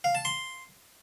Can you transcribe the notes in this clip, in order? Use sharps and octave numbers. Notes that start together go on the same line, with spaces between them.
F5
A5
C6